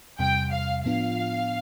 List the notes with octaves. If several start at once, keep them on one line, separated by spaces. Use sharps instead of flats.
E2 C3 G3 G5
F5
A2 F3 B3 D4 F4 F5